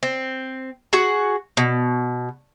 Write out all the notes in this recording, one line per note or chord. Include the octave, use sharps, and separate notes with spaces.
C4
F#4 G#4 F#5
B2